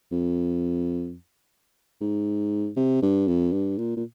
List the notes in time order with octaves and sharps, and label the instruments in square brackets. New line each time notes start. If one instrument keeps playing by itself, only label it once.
[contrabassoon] F2
G#2
C3
G2
F2
G2
A#2
A#2